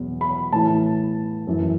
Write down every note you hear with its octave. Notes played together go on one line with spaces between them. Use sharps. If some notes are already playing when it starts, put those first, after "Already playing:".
Already playing: E2 B2 F#3
B5
A2 E3 A5
F#2 E3